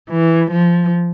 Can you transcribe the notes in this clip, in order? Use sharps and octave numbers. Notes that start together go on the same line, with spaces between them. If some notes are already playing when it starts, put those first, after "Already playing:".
E3
F3